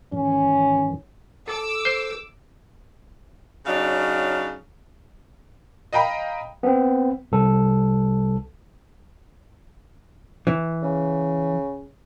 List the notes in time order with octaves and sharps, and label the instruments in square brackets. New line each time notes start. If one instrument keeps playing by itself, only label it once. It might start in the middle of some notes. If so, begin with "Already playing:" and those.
[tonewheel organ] G#2 D#3 E3 [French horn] C#4
[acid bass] A4 [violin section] D6 E6
[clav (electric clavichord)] C5
[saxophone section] C#3 F#3 D4 D#4 F5
[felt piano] D#5 F5 G5 A#5 B5
[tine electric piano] B3 C4
C2 A4
[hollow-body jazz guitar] E3
[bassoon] C#3